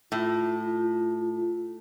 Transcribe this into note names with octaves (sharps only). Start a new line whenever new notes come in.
A2 F4